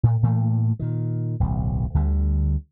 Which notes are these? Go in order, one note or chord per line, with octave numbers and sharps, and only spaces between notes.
A2
A2 E3 A3 A#3
A#2 D#3
D1 B1
D2 D3 G3